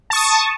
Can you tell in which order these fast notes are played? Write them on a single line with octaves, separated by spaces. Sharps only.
A5 C#6 D#6